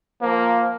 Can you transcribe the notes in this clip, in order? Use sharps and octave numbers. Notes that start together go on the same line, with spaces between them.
F3 A#3